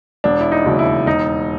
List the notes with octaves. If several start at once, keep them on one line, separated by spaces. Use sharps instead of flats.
E1 D4
E4
D#4
D#2 C#3 F#3
E4
E1 D#4